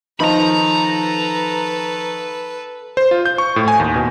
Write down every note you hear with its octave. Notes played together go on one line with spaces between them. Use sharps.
D#3 F3 D#4 A4 B4 A#5 B5
C5
F4
G6
C#6
A2
G#5
D#2
B2